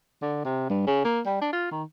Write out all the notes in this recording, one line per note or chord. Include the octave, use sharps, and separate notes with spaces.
D3
C3
G2
C#3
A#3
G3
D4
F4
D#3